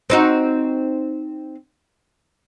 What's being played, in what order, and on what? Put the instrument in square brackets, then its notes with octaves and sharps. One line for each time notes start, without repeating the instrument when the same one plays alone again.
[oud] C4 D#4 F#4